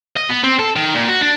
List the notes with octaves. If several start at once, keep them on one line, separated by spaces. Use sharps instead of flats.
D#5
B3
C4
A4
D#3
A#2
F#4
D4